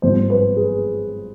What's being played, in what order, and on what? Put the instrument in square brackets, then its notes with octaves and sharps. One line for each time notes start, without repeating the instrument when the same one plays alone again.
[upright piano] G#1 G2 F3 C5
B4
G#4